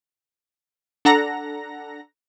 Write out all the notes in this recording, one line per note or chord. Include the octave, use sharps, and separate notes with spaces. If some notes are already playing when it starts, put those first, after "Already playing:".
D4 A4 F#5 A#5 A#6